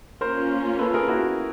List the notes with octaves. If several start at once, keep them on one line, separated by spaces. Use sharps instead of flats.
A#3 C#4 F4 A#4 C5
A4 B4
G#4 A#4
E4 F#4